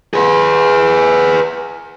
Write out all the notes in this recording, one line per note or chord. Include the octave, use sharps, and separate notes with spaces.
G#4 B4